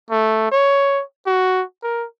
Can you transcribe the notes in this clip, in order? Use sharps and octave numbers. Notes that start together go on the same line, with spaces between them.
A3
C#5
F#4
A#4